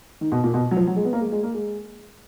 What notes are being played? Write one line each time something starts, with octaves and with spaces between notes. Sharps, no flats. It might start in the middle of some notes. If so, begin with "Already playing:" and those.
D#3
B2
A#2
B2
F#3
F3
F#3
G#3
B3
A#3
G#3
G#3
A#3
G#3